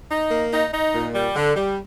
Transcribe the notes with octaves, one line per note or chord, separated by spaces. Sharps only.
D#4
A#3
D#4
D#4
A#2
G3
D3
G3